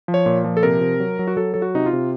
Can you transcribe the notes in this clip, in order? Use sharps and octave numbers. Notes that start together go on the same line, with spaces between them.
F3
C#5
A#2
F3
A4
C3 A#4
C3
F#3
F#3
F#4
F#3 A4
F#3 A4
F#4
C3 D#4
F4
C3